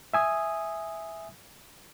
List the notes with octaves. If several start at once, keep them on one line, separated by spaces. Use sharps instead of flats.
E5 G#5 D#6